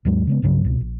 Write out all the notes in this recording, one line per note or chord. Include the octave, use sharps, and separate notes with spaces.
D#2 G#2 F#3 G#3
C#3 G#3 B3
C2 G2 C#3 F#3
C#2 B2
A#1